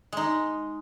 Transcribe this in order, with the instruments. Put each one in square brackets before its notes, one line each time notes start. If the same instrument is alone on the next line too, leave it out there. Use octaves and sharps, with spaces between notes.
[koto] G#3 D#4